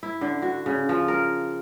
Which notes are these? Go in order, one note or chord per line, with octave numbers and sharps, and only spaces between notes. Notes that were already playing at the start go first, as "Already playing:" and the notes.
E4
D3
F#4
C#3
F3
A#4